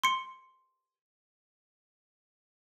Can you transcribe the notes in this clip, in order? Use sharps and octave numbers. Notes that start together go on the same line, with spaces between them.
C6 C#7